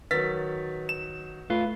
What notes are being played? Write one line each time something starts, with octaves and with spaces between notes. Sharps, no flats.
D#3 F#3 B4 A6 B6
E7
A3 F4 B4